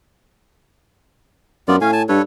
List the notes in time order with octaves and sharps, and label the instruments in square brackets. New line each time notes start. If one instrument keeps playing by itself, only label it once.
[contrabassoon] F#2 [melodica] B3 F4 D5
[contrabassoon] A2 [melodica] C#4 F5 G#5
[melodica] G#5 A5
[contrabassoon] G2 [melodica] A4 B4 C#5